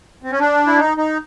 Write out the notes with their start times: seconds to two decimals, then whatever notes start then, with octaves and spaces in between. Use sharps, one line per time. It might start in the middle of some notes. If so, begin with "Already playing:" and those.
0.23 C4
0.31 C#4
0.39 D4
0.67 E4
0.78 D#4
0.97 D#4